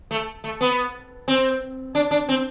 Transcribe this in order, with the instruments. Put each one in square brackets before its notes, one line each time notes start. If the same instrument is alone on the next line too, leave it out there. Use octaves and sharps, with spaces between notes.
[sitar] A3
A3
B3
C4
D4
D4
C4